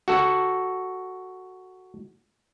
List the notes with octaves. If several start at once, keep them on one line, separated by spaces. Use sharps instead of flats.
F#4 A4